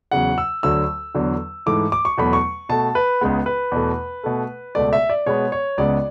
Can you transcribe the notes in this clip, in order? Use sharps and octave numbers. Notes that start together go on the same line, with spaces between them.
E2 C#3 F#3 F#5
E6
D2 D3 F#3 A3 E6
E2 D3 F#3
G#2 E3 A3 D6
D6
C#6
E2 B2 F#3 A3 B5
C#6
B2 A3 A5
B4
C#2 C#3 G#3 B3
B4
E2 B2 A3
B2 A3
C#2 B2 A3 D5
E5
D5
B2 G#3 B3 C#5
C#5
C#2 C#3 G#3 B3 D5